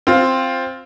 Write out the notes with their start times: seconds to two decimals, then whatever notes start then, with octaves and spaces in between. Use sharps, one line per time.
0.07 C4 F4